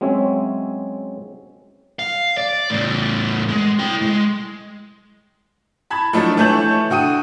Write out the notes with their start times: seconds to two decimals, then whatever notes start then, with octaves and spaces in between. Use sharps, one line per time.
0.01 F#3 G#3 C4 C#4 C#5 E5
1.99 F5
2.37 D5
2.70 E2 A2
3.48 G#3
3.79 E4 G5
4.02 G#3
5.90 A5 B5 G#6
6.13 F3 F#3 A3 D4 D#4 A4
6.37 E3 A3 C#5 A5 G6 F#7
6.90 D3 F#4 G5 D#6 D#7